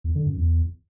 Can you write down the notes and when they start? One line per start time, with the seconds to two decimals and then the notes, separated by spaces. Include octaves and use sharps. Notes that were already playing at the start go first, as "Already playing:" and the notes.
0.04 E2
0.15 D3
0.26 F#2
0.37 E2